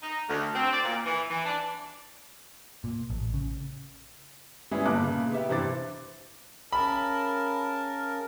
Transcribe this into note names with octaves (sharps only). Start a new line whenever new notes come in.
D#4
D2
C4
D5
A#2
E3
E3
D4
A#2
A1
C#3
G3 G#3 B3 C#4 E4 G#4
G1 A#2 A5 D6 F#6
A#2 C#3
B3 G4 E5
G2 C3 E3 C5 D6 A6
C#3 A#4 A5 B5